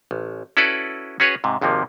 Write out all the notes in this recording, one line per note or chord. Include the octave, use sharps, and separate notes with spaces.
A1
C#4 E4 F#4 A4 B4 D5
C#4 F#4 G#4 B4 C#5
G#2 C3
G#1 D#2 C3 F3 A#3